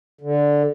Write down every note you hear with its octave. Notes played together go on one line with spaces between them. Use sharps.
D3